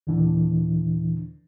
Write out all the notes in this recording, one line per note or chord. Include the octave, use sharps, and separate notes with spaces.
D#2 A#2 D3 E3 D4